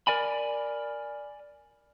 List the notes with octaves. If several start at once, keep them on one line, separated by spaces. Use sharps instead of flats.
A#4 D5 G#5 B5